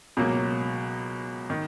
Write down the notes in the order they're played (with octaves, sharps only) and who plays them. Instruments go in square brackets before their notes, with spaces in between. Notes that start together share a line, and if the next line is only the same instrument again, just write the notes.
[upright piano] C#2 B2 F#3 A#3
D#3